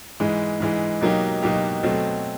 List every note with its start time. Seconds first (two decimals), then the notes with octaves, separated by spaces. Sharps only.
0.20 G#2 E3 G#3
0.60 G#2 E3 G#3
1.01 B2 F#3 A#3 D#4 G4
1.42 B2 F#3 A#3 D#4 G4
1.83 B2 F#3 A3 C4